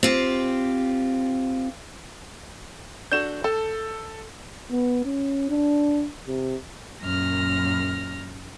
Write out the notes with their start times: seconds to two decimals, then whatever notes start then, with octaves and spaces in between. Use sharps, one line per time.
0.03 C4 F4 G4
3.12 D4 F#4 A4 G6 E7
3.44 A4 A5
4.71 B3
5.05 C#4
5.50 D4
6.28 C3
7.03 F#2 A#2 F6 A#6